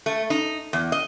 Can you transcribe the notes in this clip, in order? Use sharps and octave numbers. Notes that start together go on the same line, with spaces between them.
A3
D#4
E2
D#5